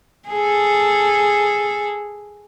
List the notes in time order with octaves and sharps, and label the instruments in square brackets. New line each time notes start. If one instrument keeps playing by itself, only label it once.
[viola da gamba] G#4 A4